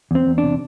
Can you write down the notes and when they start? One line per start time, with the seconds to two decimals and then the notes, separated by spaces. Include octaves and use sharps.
0.11 E2 C4
0.26 E2
0.38 D4
0.44 C3